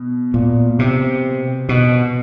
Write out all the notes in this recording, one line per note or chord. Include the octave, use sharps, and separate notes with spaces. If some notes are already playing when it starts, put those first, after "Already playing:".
Already playing: B2
A#2
C3
B2